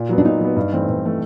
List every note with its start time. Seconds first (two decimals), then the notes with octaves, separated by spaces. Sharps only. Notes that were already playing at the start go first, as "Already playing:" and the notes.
Already playing: A#2
0.09 F#3 B3
0.18 D4
0.25 A#2 D#4
0.41 F#3 B3
0.57 G2
0.72 E3 A3 C4
0.89 G2
1.04 E3 A3 C4